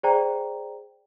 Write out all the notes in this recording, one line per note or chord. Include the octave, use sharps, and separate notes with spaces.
G#4 C5 D5 G5 A#5